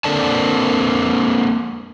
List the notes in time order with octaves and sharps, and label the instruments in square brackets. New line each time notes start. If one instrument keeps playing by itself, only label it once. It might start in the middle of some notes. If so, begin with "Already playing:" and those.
[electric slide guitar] A#3 C4 D4 A4 D5 A5